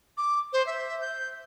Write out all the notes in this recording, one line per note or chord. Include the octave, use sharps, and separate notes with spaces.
D6
C5
E5
G6